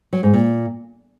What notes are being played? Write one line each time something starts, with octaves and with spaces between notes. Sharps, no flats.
F#3
G#2
A#2